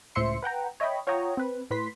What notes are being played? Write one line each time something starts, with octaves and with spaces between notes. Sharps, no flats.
C#2 A2 C5 E5 C6 C#7
B4 F#5 G5 A#5
C#5 D#5 E5 G5 B5
F4 C#5 F#5 G5 A#5 D#6
C4 B4
A2 B4 C6 B6